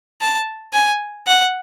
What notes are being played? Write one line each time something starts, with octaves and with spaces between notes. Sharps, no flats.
A5
G#5
F#5